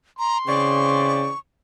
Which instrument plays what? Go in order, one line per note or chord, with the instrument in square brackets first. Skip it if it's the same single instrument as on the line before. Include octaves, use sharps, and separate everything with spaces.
[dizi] A#5 [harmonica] C6
[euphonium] C#3 [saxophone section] E3 C4 D5 [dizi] C#6